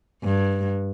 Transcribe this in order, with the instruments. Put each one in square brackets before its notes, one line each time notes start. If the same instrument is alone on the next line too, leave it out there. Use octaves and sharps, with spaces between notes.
[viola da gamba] G2